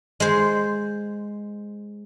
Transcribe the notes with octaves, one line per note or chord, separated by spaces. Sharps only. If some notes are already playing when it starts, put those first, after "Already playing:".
G#3 C5